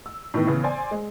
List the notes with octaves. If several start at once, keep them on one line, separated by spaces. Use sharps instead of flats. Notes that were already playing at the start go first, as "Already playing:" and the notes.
E6
A2 D#3 B3
C#3 E3 B3
C5 D5 G#5
G#3